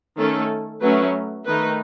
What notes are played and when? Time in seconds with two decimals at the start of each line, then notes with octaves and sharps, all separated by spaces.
0.17 D#3 A3 C#4 A4
0.81 F#3 A3 C#4 B4
1.45 D#3 A3 D#4 B4